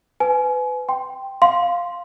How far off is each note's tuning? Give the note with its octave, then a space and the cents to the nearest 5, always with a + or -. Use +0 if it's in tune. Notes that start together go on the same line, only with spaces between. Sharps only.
B4 +25 G#5 +30
G5 +0 C6 +0
F5 +0 C6 +0